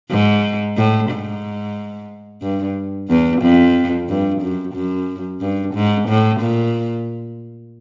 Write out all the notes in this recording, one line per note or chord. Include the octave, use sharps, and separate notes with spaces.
G#2
A2
G#2
G2
E2
F2
G2
F#2
F#2
G2
G#2
A2
A#2